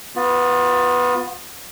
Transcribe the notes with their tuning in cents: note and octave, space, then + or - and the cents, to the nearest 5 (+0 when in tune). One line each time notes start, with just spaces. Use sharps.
B3 +0 F4 +35